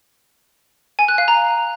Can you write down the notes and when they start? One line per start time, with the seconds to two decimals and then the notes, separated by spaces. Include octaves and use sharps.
0.99 G#5
1.08 F#6
1.18 F5
1.28 A#5